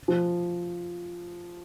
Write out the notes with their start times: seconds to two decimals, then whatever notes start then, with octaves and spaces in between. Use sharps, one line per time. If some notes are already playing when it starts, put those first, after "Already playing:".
0.08 F3